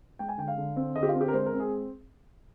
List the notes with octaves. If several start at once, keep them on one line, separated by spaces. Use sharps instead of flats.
G#3 G5
G#5
D3 G5
F5
D3
C4
D3 D#5
G4
F4
C4
G4
A#4
G#3 C5
A#4
C4
G#4